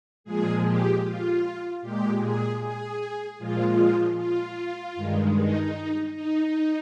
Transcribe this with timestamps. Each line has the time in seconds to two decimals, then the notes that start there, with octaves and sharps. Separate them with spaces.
0.24 A#2 F3 G#3 G#4
0.64 G4
1.03 F4
1.82 A#2 G#3 G4
2.21 G#4
2.61 G#4
3.39 A#2 F3 G#3 F4
4.17 F4
4.95 G2 D#3 G#3
5.36 D#4
6.14 D#4